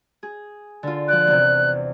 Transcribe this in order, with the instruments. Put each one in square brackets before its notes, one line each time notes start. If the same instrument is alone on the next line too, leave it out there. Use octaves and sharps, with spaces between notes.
[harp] G#4
D3 F4
[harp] F3 D5 [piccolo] F#6
[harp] E2 C3